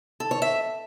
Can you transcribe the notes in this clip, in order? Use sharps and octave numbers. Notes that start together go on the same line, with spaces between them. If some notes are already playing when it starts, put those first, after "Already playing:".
A4
C#5
E5